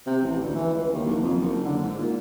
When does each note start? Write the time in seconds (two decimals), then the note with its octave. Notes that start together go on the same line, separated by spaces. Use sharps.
0.06 C3
0.23 A1
0.43 D2
0.55 E3
0.74 C#2
0.93 D#2
1.07 F#1
1.23 F2
1.41 F#1
1.65 D3
1.83 G#2
1.99 A#2